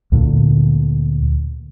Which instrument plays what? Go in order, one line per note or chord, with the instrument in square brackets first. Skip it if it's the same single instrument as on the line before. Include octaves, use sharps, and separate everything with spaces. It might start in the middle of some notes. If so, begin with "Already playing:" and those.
[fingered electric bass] D2 A#2 D3